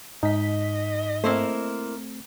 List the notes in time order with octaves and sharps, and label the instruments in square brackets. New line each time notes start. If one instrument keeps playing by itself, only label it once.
[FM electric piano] G#2 B6 [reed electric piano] D#4 [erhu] D#5
[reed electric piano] A3 C4 [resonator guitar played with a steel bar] A#3 E4 C5